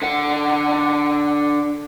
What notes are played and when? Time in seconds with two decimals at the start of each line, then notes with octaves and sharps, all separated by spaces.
0.02 D3 F#5